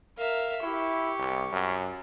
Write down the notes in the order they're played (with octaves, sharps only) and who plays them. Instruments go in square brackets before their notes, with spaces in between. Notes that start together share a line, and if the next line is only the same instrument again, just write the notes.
[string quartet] A#4 E5 F5
[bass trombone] E4 [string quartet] G4 C#6
[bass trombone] C2
F#2